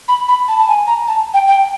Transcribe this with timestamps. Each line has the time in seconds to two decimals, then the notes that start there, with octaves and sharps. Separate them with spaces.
0.08 B5
0.28 B5
0.48 A5
0.59 A5
0.68 G#5
0.87 A#5
1.08 A5
1.34 G5
1.47 G5